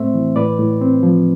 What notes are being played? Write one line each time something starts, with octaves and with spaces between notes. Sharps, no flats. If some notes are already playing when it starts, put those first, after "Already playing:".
Already playing: A2 A3 C4 C5 E5
E3
A2 B4 D5
A2
C4
F3